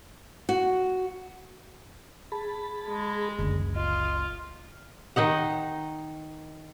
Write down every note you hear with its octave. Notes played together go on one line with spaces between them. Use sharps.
F#4
G#4 A5 B5
G#3
F#1 C#2 D3
F4 D#5
D#3 D#4 D#5 F#5